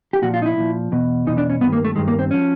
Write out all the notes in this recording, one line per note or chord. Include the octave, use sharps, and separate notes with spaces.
G4
A#2 F3 F#4
F4
D#4
E4
A#2 F3
E2 B2
E2 B2 D#4
D4
C#4
G2 D#3 B3
A#3
A3
G2 D#3 G#3
A#3
C4
F3 C#4